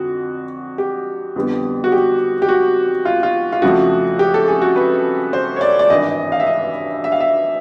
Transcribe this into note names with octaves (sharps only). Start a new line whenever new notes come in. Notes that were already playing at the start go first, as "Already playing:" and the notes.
Already playing: F2 D3 F#4
G4
F2 D3 G3 B3
F#4
G4
G4
F#4
F4
F4
F4
F2 C#3 F3 A3 F#4
G4
A4
G#4
F#4
B4
C5
C#5
D5
D5
G#1 G2 E3 D#5
F5
E5
D#5
E5
F5
E5